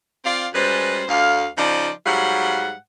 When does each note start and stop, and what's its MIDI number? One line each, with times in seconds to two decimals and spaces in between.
0.24 0.46 60
0.24 0.46 65
0.24 0.46 74
0.24 0.46 77
0.54 1.03 42
0.54 1.03 55
0.54 1.03 56
0.54 1.03 71
0.54 1.03 72
1.08 1.45 38
1.08 1.45 77
1.56 1.89 49
1.56 1.89 53
1.56 1.89 63
1.56 1.89 65
1.56 1.89 72
1.56 1.89 74
2.06 2.71 44
2.06 2.71 54
2.06 2.71 55
2.06 2.71 77
2.06 2.71 78